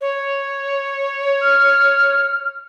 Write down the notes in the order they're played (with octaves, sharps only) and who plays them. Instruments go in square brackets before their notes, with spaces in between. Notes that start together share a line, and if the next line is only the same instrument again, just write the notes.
[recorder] C#5
[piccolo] F6